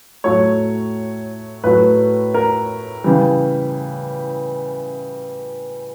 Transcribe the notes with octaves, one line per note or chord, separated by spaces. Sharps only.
A2 F#3 A3 C#5
A2 F#3 A3 B4
A#4
C#3 E3 G3